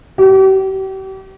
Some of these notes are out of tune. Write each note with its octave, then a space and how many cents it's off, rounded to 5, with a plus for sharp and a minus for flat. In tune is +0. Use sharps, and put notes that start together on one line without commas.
G4 -40